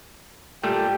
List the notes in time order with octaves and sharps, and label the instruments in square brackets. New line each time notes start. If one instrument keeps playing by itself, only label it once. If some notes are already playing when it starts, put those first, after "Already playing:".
[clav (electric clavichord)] A#2 G3 A3 [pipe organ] G4